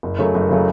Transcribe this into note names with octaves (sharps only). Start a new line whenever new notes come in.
F#1
F#2 C#3 F#3 A3
F#1
C#3 F#3 A3